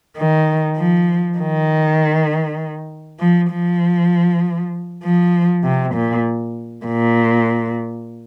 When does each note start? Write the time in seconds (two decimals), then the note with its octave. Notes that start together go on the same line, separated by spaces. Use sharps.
0.17 D#3
0.77 F3
1.38 D#3
3.20 F3
3.51 F3
5.04 F3
5.64 C3
5.94 A#2
6.86 A#2